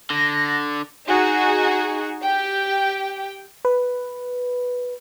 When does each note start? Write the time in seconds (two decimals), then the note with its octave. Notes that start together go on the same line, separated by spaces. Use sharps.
0.10 D3 A#6
1.07 D#4 F#4 G#4
2.22 G4 G5
3.65 B4